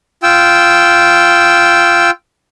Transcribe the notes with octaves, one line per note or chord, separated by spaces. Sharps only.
F4 G5 E6